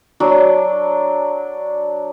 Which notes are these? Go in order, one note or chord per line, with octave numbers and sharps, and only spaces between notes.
F#3 D4